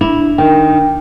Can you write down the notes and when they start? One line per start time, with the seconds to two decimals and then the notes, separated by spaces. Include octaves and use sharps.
0.01 D4 E4
0.38 D#3 G5